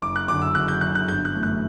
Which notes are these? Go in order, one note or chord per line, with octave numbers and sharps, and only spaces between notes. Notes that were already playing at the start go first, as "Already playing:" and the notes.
F#1 D6
F#6
F#2 D3 D6
E6
F#1 F#6
G6
F#2 D3 F#6
F#6
G1 G6
F#6
F#2 E3 A3
F#6